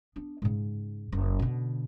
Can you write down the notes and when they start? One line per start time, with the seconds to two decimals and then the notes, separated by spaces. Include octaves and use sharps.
0.16 B3 D4
0.42 G#2 C#3
1.12 F#1
1.39 B2 D3